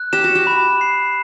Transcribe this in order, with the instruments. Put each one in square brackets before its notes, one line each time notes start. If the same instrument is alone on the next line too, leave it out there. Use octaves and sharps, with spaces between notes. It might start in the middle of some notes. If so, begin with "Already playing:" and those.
Already playing: [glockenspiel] F#6
[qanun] G4 [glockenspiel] E7
[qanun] F#4
G4
[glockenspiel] B5
C7